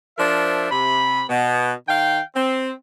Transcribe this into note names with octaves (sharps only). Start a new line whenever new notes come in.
F3 D4 A#4 C5 E5
C3 B5
B2 B3
D#3 F5 G5
C4